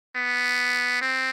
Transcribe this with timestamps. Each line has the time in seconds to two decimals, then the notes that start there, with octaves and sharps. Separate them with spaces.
0.16 B3
1.01 C4